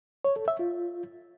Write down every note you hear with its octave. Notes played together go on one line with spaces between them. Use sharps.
C#5
A4
E5
F4